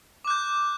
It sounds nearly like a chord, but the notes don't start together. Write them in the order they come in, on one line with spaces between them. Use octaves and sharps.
D6 F#6 G6